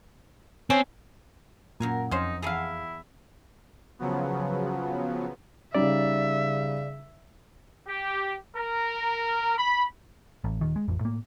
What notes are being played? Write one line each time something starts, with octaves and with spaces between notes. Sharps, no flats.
C4 C#4
F#2 A#2 A#4 F5 G#5
F2 C#4 D#4 C5
E2 E4 G#4 F5 A5 A#5
C#3 F3 F#3 B3
C#3 G3 C#4 D#4 D5 E5
G4
A#4
B5
A1
D#1 D#3
G#3
A1 F2
A2 A#3